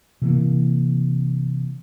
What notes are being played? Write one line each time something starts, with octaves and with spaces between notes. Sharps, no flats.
C3 E3 A#3